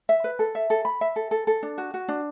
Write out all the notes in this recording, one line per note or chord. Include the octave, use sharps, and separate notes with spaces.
E5
B4
A4
E5
A4
B5
E5
A4
A4
A4
D4
F#4
F#4
D4